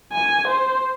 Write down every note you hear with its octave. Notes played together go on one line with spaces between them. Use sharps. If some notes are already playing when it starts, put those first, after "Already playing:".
G#5
C5